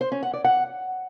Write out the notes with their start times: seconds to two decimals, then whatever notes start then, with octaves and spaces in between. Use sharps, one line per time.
0.01 C5
0.12 C#4
0.23 F#5
0.34 D5
0.44 F#5